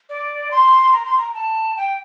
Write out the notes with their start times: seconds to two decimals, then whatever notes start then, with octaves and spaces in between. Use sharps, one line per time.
0.09 D5
0.51 C6
0.93 A#5
1.05 C6
1.18 A#5
1.34 A5
1.77 G5